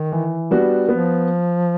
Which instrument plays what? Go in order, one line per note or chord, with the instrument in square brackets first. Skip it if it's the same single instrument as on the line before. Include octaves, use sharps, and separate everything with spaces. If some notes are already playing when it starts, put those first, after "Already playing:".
Already playing: [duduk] D#3
[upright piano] E3
G3 B3 D4 F#4
[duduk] F3 [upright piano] B3